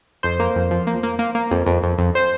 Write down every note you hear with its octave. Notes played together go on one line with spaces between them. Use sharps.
F2 C5
A#3
F2
F3
A#3
A#3
A#3
A#3
F2
F2
F2
F2
C5